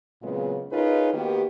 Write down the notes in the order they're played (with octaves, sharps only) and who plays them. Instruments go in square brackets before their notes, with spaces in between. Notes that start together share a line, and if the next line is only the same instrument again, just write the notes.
[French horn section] A#2 C#3 F#3 G#3 B3 C4
C#4 D#4 F4 G#4 A#4 B4
D#3 A#3 B3 F#4 G4